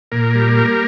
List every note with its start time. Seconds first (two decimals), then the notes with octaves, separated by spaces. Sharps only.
0.12 A#2 A#4
0.35 G3
0.57 A#3